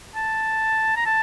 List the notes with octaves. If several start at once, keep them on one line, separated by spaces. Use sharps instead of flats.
A5
A#5
A5